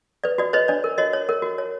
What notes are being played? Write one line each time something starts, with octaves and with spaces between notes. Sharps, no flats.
B4 D5
F#4 D5
B4 C#5 D#5
D4 D5
A#4
F#4 C#5 D#5
C#5
A#4
F#4
C#5